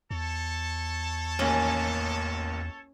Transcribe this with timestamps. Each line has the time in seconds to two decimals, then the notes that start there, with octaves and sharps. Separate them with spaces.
0.11 E2 A4 C#5 A5
1.39 A1 D#2 A#3 C#4